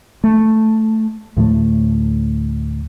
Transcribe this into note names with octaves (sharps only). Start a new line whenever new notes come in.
A3
D2 A2 F3 A3